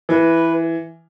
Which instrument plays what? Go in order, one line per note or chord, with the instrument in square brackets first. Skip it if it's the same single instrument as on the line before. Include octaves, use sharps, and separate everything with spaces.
[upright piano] E3 [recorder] B4